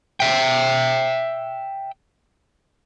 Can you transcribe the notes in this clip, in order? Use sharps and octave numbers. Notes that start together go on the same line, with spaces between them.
E5 G5